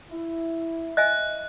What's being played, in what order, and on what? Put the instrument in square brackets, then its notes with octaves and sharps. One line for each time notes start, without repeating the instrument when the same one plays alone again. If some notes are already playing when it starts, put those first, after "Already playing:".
[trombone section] E4
[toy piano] D#5 E5 G#5 [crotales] F#6